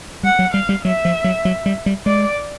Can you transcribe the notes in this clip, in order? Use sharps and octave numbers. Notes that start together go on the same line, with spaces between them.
G3 F#5
F#3
G3 F5
G3
F#3 E5
F3
F#3
F#3
G3
G3
G#3 D5